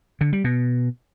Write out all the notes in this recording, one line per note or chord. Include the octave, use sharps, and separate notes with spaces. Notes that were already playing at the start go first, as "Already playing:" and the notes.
D3
G3
B2